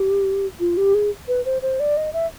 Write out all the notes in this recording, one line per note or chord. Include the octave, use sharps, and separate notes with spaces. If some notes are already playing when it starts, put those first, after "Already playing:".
Already playing: G4
F4
G4
G#4
B4
C5
C5
D5
D#5
E5